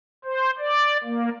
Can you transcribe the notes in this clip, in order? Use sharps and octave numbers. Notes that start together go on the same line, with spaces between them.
C5
D5
A#3